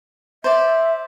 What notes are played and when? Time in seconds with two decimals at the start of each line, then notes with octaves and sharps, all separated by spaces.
0.44 C5 D5 E5